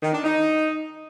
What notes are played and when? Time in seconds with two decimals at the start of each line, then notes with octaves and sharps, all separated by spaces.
0.02 D#3
0.13 D4
0.24 D#4